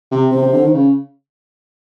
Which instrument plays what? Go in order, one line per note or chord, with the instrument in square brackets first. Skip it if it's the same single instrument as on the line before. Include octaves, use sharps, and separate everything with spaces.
[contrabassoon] C3
[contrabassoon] C3 [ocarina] C5
[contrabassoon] C3
D3
D#3
C#3